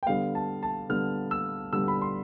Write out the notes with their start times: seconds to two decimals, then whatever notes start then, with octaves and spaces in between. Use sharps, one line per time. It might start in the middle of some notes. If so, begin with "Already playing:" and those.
0.03 G5
0.06 D3 G3 B3 F5
0.35 A5
0.63 A5
0.89 D3 G3 B3 F6
1.31 E6
1.73 D3 G3 B3 E6
1.88 B5
2.02 C6